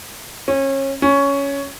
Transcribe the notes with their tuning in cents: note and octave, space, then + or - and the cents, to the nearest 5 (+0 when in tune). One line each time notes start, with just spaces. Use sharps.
C#4 -30
C#4 +10